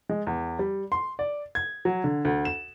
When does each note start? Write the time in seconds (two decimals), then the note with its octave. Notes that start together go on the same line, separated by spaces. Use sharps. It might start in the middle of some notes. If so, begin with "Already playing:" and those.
0.10 G#3
0.27 E2
0.59 G3
0.92 C6
1.19 D5
1.55 G#6
1.85 F#3
2.04 D3
2.25 D2
2.45 E7